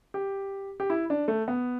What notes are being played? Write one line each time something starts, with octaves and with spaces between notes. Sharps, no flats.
G4
G4
E4
D4
A3
B3